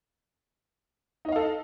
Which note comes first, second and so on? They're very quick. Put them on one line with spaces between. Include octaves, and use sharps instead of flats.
D#4 D#5 F5 A4